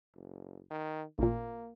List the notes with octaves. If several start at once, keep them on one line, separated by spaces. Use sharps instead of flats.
F#1
D#3
A1 A#2 A#3